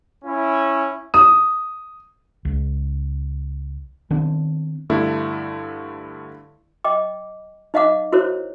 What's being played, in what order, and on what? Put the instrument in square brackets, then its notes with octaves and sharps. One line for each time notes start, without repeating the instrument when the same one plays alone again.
[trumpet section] C#4 E4
[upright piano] D#6
[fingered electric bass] C#2
D#3 B3 C4 D4
[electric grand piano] G2 D3 A3 E4
[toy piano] D#5 G5 D6
D#4 D#5 F5 F#5 D6
E4 F#4 A#4 C5 C#5